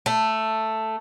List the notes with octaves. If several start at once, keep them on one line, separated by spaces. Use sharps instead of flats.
A3